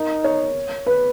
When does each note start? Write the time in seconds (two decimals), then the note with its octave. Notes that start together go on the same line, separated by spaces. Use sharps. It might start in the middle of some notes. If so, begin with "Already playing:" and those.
Already playing: D#4 A#4
0.24 C#5
0.86 B4